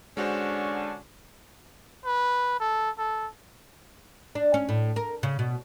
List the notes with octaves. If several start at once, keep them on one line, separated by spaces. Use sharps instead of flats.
D3 G#3 C#4 D4 F#4 C5
B4
A4
A4
D4
C#4
A2
A#4
C#3
B2